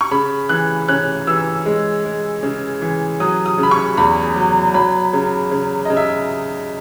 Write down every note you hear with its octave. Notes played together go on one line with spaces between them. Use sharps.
C#6
C#3 B5
E3 F#6
C#4 F#6
E3 E6
G#3
G#3
C#3
E3
F#3 D#6
D#6
C#3
B5
C#6
E2 B5
F#3
F#3 B5
C#3
C#3
C#3 D#5
E5